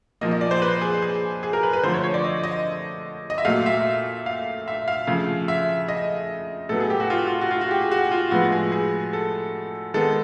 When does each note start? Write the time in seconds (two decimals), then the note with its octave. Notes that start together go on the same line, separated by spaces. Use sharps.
0.21 A#2 F3 A#3 D#5
0.31 D#5
0.41 D5
0.51 C5
0.62 B4
0.81 G#4
1.02 G#4
1.43 G#4
1.53 A#4
1.63 B4
1.73 B4
1.83 D3 F3 A3 C5
1.94 C#5
2.04 C#5
2.14 D5
2.24 D#5
2.44 D#5
3.30 D#5
3.38 E5
3.45 A#2 F#3 A3 F5
3.66 E5
4.26 F5
4.68 E5
4.88 F5
5.07 C#3 F3 A3 F5
5.48 E5
5.88 D#5
6.69 A2 F#3 B3 A4
6.80 G#4
6.90 G4
7.00 F#4
7.10 F4
7.19 F#4
7.27 F4
7.41 F#4
7.51 F4
7.61 F#4
7.71 G4
7.81 G#4
7.91 F#4
8.11 F4
8.31 A2 F3 G#3 B3 F#4
8.52 G#4
8.72 G#4
9.13 A4
9.94 D#3 G#3 B3 A4